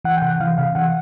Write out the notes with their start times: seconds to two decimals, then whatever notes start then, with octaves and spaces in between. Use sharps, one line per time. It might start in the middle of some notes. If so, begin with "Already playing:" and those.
0.05 E3 F#5
0.17 G5
0.22 C3 F#5
0.40 E3 F5
0.58 C3 F5
0.75 E3 F#5